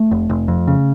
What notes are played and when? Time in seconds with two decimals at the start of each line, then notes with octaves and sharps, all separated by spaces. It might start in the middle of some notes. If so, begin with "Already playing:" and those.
Already playing: A3
0.11 F1
0.30 F1
0.48 F2
0.68 C#3